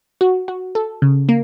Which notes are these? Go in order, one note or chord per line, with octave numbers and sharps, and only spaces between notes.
F#4
F#4
A4
C#3
A#3